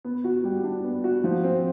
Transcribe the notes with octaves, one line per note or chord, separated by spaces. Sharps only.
B3
F#4
G3
D4
B3
F#4
F3
C4